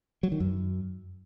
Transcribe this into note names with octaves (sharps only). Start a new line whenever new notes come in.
F#3
D#3
F#2